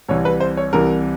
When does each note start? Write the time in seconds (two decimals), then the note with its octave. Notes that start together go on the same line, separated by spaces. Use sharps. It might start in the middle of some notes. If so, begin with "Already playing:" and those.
0.09 C2 C3 E3 C#5
0.25 B4
0.40 C5
0.57 C#5
0.73 C2 C3 E3 A#4